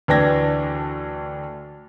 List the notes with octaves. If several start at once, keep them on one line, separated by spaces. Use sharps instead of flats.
D2 E3 D4 G5 G#6 A#6